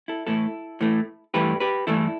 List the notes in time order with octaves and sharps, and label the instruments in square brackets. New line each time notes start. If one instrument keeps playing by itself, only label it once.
[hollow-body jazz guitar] E4 A4
A2 E3 A3 E4 A4
A2 E3 A3
G2 E3 A3 G4 B4
G4 B4
G2 E3 A3 E4 A4